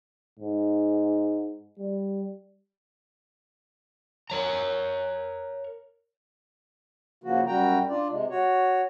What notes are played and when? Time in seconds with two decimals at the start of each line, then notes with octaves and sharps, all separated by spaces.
0.39 G#2
1.79 G3
4.30 A#4 C#5 A#5
7.24 C#3 F3 A#3 F#4
7.47 F#2 G3 F#4 G5 A#5
7.89 D4 F4 D5
8.10 C3 G#3
8.30 F#4 C#5